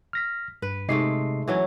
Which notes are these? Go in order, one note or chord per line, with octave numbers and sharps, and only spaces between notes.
F6 A#6 B6
G2 B4
G#2 C3 G#3 A3 D#5 C7
E3 F#3 C#4